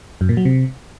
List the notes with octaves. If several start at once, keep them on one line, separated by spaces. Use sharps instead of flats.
F#2
A#2
F#3
C3